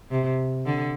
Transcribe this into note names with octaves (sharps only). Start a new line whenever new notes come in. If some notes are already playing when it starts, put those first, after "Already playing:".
C3
D3